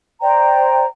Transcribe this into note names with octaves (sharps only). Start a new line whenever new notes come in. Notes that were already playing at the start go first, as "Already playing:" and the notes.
C5 D5 G5 A#5